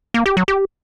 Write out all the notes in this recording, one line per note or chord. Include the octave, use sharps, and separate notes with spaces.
A#3
G4
F#3
G4